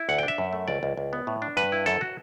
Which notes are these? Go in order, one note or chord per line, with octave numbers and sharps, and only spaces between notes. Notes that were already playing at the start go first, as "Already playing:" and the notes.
Already playing: E4
D2 F#5
D4 G5
E5
F#2
A3
C#2 D5
C#2
C#2
B3
A2
D4
G2 B4
E4
F#2 A4
F#4